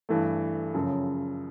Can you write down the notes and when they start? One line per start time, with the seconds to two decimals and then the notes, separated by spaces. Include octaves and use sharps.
0.09 G2 E3 A3
0.74 F#2 C#3 F3